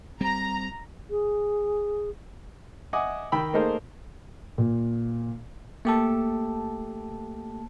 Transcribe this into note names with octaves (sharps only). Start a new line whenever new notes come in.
G3 C4 A#5
G#4
D#5 E5 F#5 G#5 D6 D#6
D#3 G5 B5 E6
A3 A#3 D#4 G#4 A#4 C5
A#2
A3 A#3 G4 A4 A5